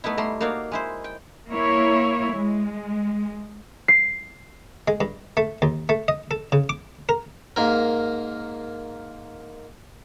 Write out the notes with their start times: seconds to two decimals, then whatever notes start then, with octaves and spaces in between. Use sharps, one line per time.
0.04 A3 B3 D#4 E4
0.17 G3 A3 A#5 C6
0.41 A#3 D#4 F#4 C#5 D5 F5
0.72 G#3 E4 C5
1.04 G5
1.51 A#3 E4 C#5
2.34 G#3
3.88 C7
4.88 G#3
5.01 G2
5.37 A3
5.62 D#2
5.89 A3
6.08 D#5
6.31 A4
6.52 C#3
6.69 D6
7.09 A#4
7.56 G#2 A#3 A#4